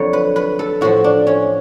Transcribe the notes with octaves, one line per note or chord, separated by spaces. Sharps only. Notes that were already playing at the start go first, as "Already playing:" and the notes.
Already playing: F2 D3 F#3 C#5
B4
B4
A4
A2 F3 F#4
D4
C#4